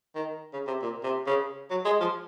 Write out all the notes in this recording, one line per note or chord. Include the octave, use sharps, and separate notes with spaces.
D#3
C#3
C3
A#2
C3
C#3
F#3
G#3
F3